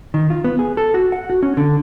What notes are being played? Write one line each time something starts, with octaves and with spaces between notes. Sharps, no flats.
D#3
F4
B3
G#4
A4
F#4
F#5
F#4
C#4
D3